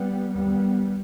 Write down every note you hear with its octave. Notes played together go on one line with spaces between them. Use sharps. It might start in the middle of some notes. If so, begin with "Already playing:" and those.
Already playing: G3 B3
D#2 G3 B3